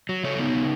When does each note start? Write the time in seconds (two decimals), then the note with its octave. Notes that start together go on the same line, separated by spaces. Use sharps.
0.09 F#3
0.24 C#3 A4 C#5
0.39 B3 D#4
0.54 C#3